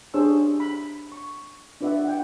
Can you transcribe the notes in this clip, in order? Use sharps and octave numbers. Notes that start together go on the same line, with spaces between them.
D4 G4 G#4 C5 C#5 E6
B5
C#6
D4 F4 B4 D5 E5 F#5
F#5 G5